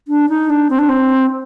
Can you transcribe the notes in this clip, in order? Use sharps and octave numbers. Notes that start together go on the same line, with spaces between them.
D4
D#4
D4
C4
D4
C4